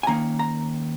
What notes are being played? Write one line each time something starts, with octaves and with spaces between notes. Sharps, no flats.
G#5
D#3 A#3 C#4 A#5
A#5